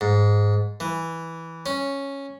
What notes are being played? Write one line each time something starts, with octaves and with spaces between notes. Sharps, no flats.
G#2
E3
C#4